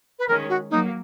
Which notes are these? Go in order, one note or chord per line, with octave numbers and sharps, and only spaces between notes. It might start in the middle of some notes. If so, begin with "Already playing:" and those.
B4
D#3 G#3 C#4 A#4
F#4
F#3 A#3 D#4